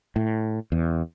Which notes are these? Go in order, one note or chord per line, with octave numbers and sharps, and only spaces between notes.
A2
E2